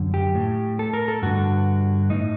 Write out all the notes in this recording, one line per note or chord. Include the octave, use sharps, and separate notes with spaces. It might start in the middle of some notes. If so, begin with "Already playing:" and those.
Already playing: F#2 D3
G4
A2
A4
A#4
A4
G2 D3 F#4
A2 D#4